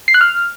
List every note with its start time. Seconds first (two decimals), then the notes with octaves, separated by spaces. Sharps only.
0.08 C7
0.14 F#6
0.21 F6